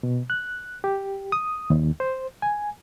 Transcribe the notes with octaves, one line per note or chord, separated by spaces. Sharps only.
B2
F#6
G4
D#6
D#2
C5
G#5